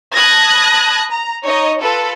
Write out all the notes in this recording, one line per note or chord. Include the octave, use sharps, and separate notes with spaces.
A5 B5 D#6 F#6 G#6 A#6
A#5
D#4 C#5 D#5
F4 A4 B4